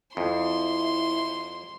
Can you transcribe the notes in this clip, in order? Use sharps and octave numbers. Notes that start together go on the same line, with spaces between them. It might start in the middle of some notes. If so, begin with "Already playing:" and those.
F2 E4 C6